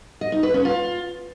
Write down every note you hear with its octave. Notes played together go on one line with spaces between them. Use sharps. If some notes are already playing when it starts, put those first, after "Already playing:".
D#5
D#4
B4
C#4
F4